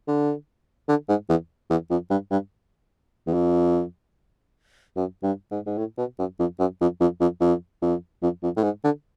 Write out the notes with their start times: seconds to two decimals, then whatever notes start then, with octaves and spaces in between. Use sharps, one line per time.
0.08 D3
0.89 D3
1.09 G#2
1.29 E2
1.70 E2
1.91 F2
2.10 G2
2.31 G2
3.27 E2
3.33 F2
4.96 F#2
5.23 G2
5.51 G#2
5.66 G#2
5.78 A2
5.98 B2
6.19 F#2
6.39 F2
6.59 F#2
6.81 F2
7.00 F2
7.21 F2
7.41 F2
7.82 F2
8.23 F2
8.43 F2
8.57 A2
8.63 G#2
8.84 D3